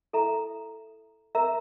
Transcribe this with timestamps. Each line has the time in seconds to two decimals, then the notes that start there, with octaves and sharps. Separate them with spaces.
0.13 E4 A4 E5 A#5
1.35 A#4 E5 A#5